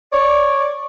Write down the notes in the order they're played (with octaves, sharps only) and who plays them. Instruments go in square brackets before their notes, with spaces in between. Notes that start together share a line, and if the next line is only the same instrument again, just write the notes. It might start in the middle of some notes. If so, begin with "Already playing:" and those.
[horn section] C#5 D5